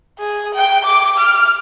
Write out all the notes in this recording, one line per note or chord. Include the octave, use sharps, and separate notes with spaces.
G#4
G5
D6
F6